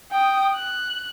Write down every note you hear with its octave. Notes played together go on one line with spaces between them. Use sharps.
G5 D#6
F#6